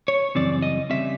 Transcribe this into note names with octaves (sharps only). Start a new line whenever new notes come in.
C#5
F#2 C#3 E3 G3 C4 D5
D#5
C#3 E3 G3 C4 E5